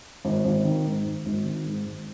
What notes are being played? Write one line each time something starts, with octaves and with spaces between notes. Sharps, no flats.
G#1
G#1
D#3
G#2
G#1
G#1
D#3
G#2
G#1